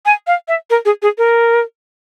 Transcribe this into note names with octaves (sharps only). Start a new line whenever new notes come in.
G#5
F5
E5
A#4
G#4
G#4
A#4